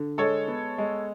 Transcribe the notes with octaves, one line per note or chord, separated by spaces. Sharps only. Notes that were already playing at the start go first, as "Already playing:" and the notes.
Already playing: D3
G#3 A4 C#5
B3
G#3